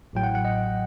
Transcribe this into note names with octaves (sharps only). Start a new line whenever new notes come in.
A1 A2 F#3 G5
F#5
F#5
D#5